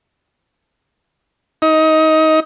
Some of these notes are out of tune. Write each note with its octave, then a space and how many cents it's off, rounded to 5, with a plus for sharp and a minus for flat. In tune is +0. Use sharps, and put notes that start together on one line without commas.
D#4 +20